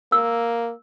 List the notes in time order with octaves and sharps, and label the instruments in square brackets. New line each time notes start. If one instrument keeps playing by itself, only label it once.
[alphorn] A#3 [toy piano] E6